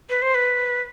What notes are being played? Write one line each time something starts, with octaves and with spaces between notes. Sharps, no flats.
B4
C5
B4